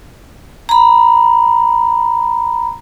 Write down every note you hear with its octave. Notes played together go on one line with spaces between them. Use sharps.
A#5 B5